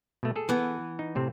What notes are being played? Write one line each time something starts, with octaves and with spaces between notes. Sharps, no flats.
B2 A3
G#4 A4
E3 B3
D#4
A2 C3 C4